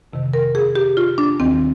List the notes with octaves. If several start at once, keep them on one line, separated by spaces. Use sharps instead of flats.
F2 C3 D#3
A#4
G#4
G4
F4
D4
D#2 D#3 G3 C4